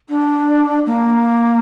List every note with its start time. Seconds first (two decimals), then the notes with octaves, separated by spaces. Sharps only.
0.08 D4
0.86 A#3